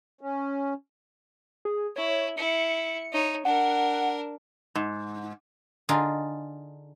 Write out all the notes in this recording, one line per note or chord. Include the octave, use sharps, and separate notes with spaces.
C#4
G#4
E4 C#5
E4 C#7
D#4 C#5
D4 A#4 F#5
G#2
D3 D#4 F4 G#4